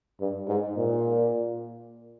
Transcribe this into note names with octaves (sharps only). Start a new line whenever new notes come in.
G2
G#2
A#2